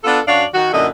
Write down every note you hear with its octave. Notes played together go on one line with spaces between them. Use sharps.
B3 D4 F4 A4
F#2 D4 F#4 C#5 D5 F5
D#3 F#4
F#2 A#2 D3 E4 A4 D#5